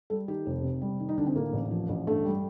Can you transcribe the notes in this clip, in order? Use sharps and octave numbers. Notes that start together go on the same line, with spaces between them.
G3 A4
D#3 G4
F1
C3
G3
D#3
D#4
D2 D4
C4
A2 A#3
A1
F3
A1
G2 A3
G3